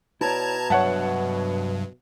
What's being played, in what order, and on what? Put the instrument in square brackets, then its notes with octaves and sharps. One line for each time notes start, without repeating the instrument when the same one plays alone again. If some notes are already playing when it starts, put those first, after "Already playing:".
[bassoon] B2 [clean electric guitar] E4 C#5 D5 [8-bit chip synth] A5 A#5 G#6
[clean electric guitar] C2 F#3 E5 [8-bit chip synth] G2 [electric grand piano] C#5 F#5 A5